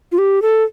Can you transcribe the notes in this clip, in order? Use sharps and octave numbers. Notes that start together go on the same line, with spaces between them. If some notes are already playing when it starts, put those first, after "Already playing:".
F4
G4
A4